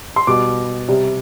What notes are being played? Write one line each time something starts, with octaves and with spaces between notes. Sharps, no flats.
C6
B2 G3 D6
C3 G3